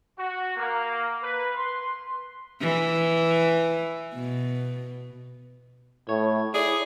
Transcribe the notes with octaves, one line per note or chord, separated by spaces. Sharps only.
F#4
A#3
B4
C6
E3
B2
A2 C#5
E4 G#4 D5